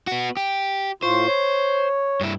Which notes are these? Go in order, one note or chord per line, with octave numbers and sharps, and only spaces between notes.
B3 F#4
G4
A2 F4 C5 C#6
C#5
G2 E4